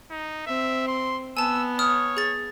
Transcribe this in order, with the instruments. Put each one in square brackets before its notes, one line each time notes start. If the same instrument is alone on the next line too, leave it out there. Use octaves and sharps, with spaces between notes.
[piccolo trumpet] D#4
[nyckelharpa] C4 [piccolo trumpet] E5
[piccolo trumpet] C6
[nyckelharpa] B3 [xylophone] G#5 A5 [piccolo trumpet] E6
[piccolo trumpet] C#5 [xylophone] D#6 F6
[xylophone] G#4 A6